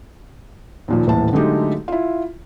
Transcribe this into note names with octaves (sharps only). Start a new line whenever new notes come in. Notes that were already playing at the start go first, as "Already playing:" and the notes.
D#2 A#2 F3
D#1 A2 E3 A5
D3 F#3 G#3 A3 D#4 G4
E4 F4